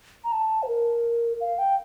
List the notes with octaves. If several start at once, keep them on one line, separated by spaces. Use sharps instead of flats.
A#5
A5
C5
A#4
F5
G5